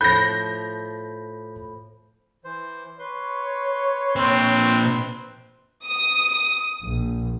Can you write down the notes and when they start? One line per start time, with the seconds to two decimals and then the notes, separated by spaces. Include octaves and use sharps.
0.01 A2 F3 B5 G6 A#6
2.44 E3 C5
2.99 B4 C#5 C6
4.16 A#2 C4 C5
5.85 D#6
6.81 A#1